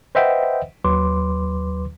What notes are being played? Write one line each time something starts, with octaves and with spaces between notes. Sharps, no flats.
B4 C5 D#5 E5 F#5 G5
D#2 F#3 B4 C6 D6